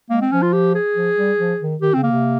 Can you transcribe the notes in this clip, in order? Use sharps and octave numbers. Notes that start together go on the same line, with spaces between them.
G#3 A#3
C4
F3 C#4
F4
G4
G#4
F3
G3
F3
D#3
D#3 G4
C#3 C4
A#3
C3